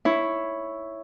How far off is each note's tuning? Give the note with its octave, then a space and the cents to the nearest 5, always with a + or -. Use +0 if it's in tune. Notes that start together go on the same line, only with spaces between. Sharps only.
E4 +0 C#5 +0